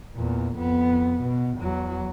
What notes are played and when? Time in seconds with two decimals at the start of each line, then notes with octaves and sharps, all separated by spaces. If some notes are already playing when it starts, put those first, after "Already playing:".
0.15 E2 A#2
0.56 F2 B3
1.22 B2
1.58 E2 F#3